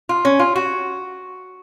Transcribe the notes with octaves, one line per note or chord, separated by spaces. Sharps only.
F4
C#4
F4
F#4